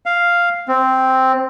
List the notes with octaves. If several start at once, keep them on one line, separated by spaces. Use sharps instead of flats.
F5
C4